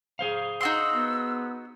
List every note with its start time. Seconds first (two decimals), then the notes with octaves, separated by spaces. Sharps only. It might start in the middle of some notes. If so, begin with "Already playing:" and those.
0.19 G#4 C5 F5
0.61 D#4 F#4 C6 E6
0.93 B3